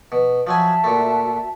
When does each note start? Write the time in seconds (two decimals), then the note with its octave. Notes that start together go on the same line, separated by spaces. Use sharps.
0.12 B2
0.47 F3 F#3 F#4 E5 G#5 A5
0.84 A#2 A3